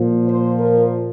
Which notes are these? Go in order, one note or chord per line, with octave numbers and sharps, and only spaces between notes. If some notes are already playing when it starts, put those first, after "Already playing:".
Already playing: A#2 F3
C5
A#4